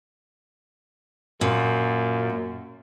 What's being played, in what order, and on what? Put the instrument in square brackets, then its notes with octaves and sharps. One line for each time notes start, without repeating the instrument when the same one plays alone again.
[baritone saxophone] F#2 [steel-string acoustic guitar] A#2